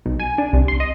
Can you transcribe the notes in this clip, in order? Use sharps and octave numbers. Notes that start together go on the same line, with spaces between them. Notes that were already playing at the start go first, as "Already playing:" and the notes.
B1
G#5
D4
C2
C6
D#5